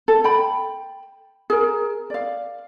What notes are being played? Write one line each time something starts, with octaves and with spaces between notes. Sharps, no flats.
A4
G5 B5
G#4 A#4
D5 F5